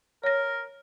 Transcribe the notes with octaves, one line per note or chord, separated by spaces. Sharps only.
A#4 C#5 A#6